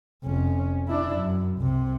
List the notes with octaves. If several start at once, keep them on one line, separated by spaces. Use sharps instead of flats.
F1 C#4
D4 E4
F#2
C2 C3